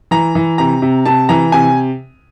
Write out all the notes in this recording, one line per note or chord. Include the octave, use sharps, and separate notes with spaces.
E3 A#5
E3
C3 A#5
C3
C3 A5
E3 A#5
C3 G#5